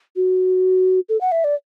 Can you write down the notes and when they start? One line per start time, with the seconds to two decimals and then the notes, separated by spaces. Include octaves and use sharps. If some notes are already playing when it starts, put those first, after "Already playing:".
0.16 F#4
1.09 A4
1.21 F#5
1.32 E5
1.44 D5